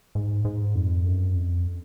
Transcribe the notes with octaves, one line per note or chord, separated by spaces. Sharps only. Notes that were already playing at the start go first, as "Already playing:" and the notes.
G#2
G#2
F2
F#2
F2